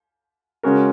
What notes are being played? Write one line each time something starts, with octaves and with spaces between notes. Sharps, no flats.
C#3 G#3 C#4 F#4 A#4